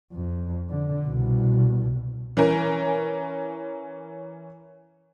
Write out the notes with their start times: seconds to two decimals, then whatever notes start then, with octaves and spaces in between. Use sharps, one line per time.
0.13 F2
0.70 D3
1.07 C2 B2
2.37 E3 C#4 A#4